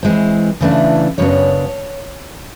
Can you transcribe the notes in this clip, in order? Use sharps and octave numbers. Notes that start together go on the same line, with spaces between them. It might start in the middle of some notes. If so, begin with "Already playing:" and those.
E3 G#3 C4
C#3 E3 A3 D4
F#2 C#3 F#3 B3 D4 C#5